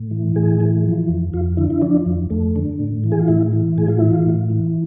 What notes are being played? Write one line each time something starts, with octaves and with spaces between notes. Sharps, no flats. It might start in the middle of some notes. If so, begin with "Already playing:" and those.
Already playing: A2
E3
A2 G#4
E3
F3
F2
F2 F4
D3 E4
E4
F3 D4
F2
F2 A3
D3
A2
E3
G#4
F4
A2 E4
E3
A2 G#4
F4
E3 E4
F4
A2
E3